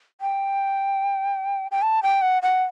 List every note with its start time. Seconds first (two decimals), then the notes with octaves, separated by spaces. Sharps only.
0.21 G5
1.71 G5
1.82 A5
2.03 G5
2.22 F#5
2.43 F#5